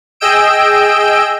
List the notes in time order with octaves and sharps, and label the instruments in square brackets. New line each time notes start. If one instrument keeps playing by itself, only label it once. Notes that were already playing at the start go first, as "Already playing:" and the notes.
[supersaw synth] G#4 D#5 G5 E6 D7